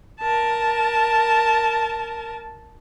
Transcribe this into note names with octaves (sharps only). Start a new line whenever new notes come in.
A#4 A5